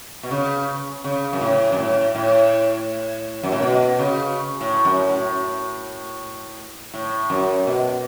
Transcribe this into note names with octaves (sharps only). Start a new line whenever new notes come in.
B2
C#3
C#3
F#2
A2
F#2
A2
A2
F#2
A2
B2
C#3
A2
F#2
A2
A2
F#2
B2